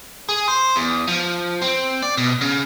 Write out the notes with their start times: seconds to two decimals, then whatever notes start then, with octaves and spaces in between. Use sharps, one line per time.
0.29 G#4
0.48 C5
0.76 E2
1.07 F3
1.62 C4
2.03 D5
2.17 B2
2.41 C#3